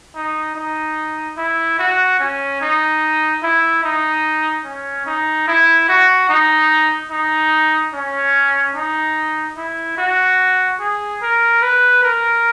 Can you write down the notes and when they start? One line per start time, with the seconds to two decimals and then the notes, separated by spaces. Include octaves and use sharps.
0.15 D#4
0.55 D#4
1.37 E4
1.79 F#4
2.20 C#4
2.61 D#4
3.43 E4
3.83 D#4
4.65 C#4
5.06 D#4
5.48 E4
5.89 F#4
6.29 D#4
7.11 D#4
7.93 C#4
8.75 D#4
9.57 E4
9.98 F#4
10.80 G#4
11.22 A#4
11.62 B4
12.03 A#4